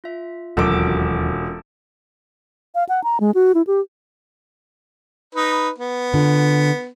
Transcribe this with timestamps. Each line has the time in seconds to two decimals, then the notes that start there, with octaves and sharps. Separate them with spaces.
0.04 F4 E5
0.57 E1 D#2 F#3 C#4 F4 A4 A#4 D6
2.75 F5
2.89 F#5
3.04 A#5
3.20 G#3
3.35 F#4
3.54 E4
3.67 G4
5.35 D#4 B4
5.79 B3
6.14 D3 F4